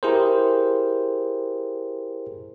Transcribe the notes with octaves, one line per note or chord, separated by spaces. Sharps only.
E4 G4 G#4 A#4 C5